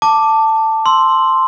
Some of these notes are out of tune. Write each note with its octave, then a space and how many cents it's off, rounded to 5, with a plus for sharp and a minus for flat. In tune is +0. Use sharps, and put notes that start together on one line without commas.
A5 +10 D6 +0
C6 +0 E6 +0